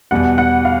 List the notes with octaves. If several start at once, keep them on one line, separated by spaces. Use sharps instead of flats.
E2 B2 G3 F#5
F#5
F5